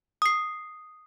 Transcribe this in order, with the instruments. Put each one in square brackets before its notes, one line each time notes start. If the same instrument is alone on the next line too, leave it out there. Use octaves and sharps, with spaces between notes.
[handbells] D#6 C7